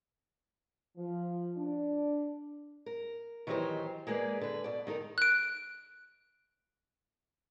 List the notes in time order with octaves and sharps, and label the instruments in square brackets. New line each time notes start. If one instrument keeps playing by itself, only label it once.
[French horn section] F3
D4
[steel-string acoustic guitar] A#4
D#3 E3 F#3 D#4 G4 C5
G#3 A#3 G#4 A4 B4 D5
D3 B4
B2 D5
D#3 D#4 A4 A#4
[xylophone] F#6 D7